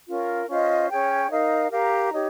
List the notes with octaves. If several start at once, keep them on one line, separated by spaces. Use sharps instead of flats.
C#4 F4 A#4
C#4 F4 C5 D#5
C#4 G#4 C#5 G5
D#4 A#4 F5
G4 A#4 F5 A#5
D#4 G4 C#5